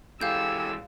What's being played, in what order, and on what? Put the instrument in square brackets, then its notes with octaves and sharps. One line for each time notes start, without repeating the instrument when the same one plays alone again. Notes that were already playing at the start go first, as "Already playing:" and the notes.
[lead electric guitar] E3 G#3 [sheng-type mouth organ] G4 A4 G#5 [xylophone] F5 G6 [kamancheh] E6